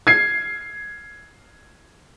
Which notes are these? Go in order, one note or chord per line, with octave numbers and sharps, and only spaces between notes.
G#6 C7